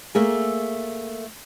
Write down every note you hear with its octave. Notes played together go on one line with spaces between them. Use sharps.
A3 A#3 G#4